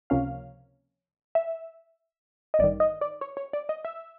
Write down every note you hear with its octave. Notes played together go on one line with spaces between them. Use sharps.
C#2 C3 F3 A#3 C#4 F5
E5
D#5
A1 G2 D#3 D5
D#5
D5
C#5
C#5
D5
D#5
E5